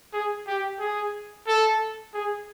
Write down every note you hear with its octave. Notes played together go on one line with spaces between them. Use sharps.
G#4
G4
G#4
A4
G#4